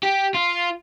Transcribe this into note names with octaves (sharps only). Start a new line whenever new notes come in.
G4
F4